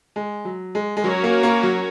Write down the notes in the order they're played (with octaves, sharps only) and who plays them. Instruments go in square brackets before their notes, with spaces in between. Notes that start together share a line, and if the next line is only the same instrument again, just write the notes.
[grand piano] G#3
F#3
G#3
G#3
[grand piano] F#3 [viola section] C#4 F#4 A#4 C#5
[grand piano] A#3
A#3
F#3